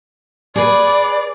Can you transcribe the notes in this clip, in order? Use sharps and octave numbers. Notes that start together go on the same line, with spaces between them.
G#4 B4 D5